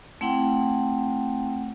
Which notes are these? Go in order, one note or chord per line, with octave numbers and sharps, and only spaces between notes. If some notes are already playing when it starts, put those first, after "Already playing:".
A3 C4 E4 F#5 G5